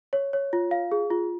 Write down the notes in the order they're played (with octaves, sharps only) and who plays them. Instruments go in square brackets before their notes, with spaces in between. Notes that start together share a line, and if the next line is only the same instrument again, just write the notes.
[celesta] C#5
C#5
F4
F5
G#4
F4